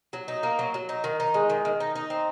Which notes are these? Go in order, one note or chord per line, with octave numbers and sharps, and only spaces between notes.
F#3
D#4
A#3
F#3
F#3
D#4
D#3
D#4
G#3
D#3
D#3
D#4
D#4
C4